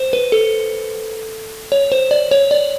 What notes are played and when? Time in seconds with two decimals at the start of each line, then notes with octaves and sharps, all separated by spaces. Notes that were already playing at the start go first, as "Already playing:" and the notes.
Already playing: C5
0.13 B4
0.32 A4
1.72 C#5
1.92 C5
2.11 D5
2.31 C#5
2.51 D5